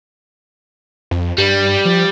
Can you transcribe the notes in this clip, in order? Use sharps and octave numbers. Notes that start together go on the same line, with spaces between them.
F2
G2 G3
F3